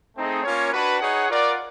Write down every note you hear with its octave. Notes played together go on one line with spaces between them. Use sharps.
A3 C4 D#4 G#4
A#3 C#4 F4 A#4 C#5
D4 F#4 B4
D#4 G#4 C#5 F#5
F4 A#4 D5 F#5